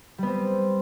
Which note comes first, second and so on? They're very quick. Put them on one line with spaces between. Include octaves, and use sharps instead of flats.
G3 B3 C4